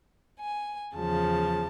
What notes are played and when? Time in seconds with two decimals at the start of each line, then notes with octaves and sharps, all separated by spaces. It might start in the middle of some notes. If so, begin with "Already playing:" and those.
0.39 G#5
0.95 E2 C#3 F3 A5